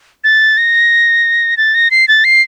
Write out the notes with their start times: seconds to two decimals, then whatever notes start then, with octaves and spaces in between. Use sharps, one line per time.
0.24 A6
0.58 A#6
1.57 A6
1.75 A#6
1.91 C7
2.08 A6
2.24 C7